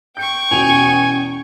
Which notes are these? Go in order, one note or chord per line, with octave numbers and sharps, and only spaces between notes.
G5 C#6 G6 C#7 D7
E2 B2 C#4 G#5 F7